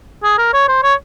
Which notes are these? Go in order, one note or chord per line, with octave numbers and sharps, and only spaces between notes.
G#4
A#4
C#5
C5
C#5